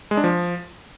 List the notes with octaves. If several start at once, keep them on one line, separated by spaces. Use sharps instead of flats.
G#3
D4
F3